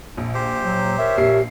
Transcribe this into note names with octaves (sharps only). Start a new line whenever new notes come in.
A#1
G4 C5
F#3
A#4 C#5 E5
A#1 G4 C7